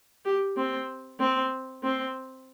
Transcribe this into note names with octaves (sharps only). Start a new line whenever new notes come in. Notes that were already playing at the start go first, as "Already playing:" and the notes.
G4
C4
C4
C4